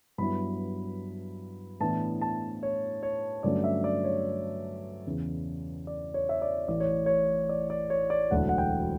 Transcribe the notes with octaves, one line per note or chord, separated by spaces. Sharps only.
G2 F#3 B3 E4 B5
A2 E3 B3 D4 A5
A5
C#5
C#5
G2 D3 F#3 A3 C#4 D5
E5
D5
C#5
E2 C#3 E3
D5
C#5
E5
D5
A1 A2 E3 D5
C#5
C#5
D5
D5
C#5
D5
E1 D2 D3 F#3 A3 F#5
F#5
G5